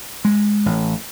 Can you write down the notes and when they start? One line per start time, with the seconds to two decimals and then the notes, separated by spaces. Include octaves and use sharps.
0.25 G#3
0.66 A1